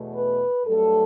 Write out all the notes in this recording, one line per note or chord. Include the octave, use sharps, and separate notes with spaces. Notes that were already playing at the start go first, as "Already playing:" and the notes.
Already playing: E2 B2 A3
B4
G2 F#3 A3 A4